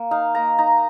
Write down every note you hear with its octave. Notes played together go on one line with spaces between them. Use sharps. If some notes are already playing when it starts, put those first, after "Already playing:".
Already playing: A#3
D#4 F5
A#3 A#5
D#4 A#5